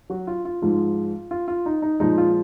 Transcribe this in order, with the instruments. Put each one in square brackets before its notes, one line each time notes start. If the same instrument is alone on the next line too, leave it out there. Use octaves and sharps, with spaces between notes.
[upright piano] F#3 F#4
F4
F4
G#2 F3 G#3 F4
F4
F4
D#4
D#4
A#2 F3 G#3 D#4
F4